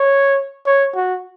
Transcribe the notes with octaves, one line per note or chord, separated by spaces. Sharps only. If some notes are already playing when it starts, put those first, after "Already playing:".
Already playing: C#5
C#5
F#4